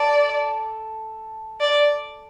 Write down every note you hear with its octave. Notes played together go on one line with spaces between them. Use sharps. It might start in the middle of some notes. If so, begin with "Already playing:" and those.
Already playing: A4 D5
D5